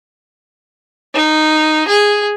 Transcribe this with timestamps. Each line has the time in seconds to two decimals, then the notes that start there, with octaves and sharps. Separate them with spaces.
1.14 D#4
1.88 G#4